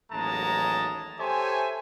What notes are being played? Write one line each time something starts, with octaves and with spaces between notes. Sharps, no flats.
A1 D#2 F#3 G#3 A5 A#5
G4 A4 C5 C#5 E5 G#5